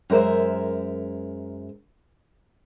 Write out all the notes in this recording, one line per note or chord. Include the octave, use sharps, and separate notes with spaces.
F#2 G#3 A#4 C5 E5